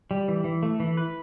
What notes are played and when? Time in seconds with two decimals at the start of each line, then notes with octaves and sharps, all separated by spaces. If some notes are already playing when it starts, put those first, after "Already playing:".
0.11 G3
0.28 E3
0.44 E3
0.63 A3
0.80 E3
0.97 B4